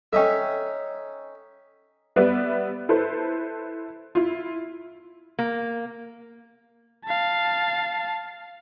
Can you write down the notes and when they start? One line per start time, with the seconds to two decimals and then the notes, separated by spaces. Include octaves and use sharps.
0.13 C#4 D#4 A4 E5 G5
2.16 G3 B3 B4 D5 E5
2.89 E4 A4 B4 C5
4.15 E4 F4
5.39 A#3
7.06 F5 A5